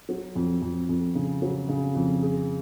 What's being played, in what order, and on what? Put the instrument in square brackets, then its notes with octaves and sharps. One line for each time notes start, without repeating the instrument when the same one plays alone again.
[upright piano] F#3
F2
F2
F2
C#3
F#3
C#3
F2
G#4